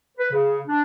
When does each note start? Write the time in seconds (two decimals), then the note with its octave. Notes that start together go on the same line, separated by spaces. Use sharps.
0.18 B4
0.32 C#3
0.67 D4